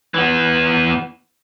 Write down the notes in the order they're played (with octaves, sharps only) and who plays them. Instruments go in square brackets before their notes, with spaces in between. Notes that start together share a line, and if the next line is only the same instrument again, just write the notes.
[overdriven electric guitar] E3 B3